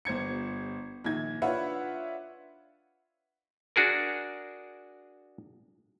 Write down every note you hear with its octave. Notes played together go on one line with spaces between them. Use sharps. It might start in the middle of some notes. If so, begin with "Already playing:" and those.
G1 C5 G#6 C#7
A#1 D#3 G#6
D4 F4 B4 C#5 E5 F#5
D4 F#4 G#4 A#4